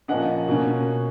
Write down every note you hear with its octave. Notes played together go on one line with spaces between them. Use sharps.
A#2 F3 A#3 C#4 D#5 F#5
B2 A#3 C#4